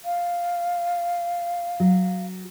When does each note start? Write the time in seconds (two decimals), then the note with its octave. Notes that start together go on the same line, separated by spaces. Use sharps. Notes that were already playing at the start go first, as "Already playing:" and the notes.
0.05 F5
1.80 F#3